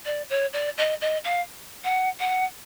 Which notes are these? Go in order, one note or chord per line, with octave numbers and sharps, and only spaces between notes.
D5
C#5
D5
D#5
D#5
F5
F#5
F#5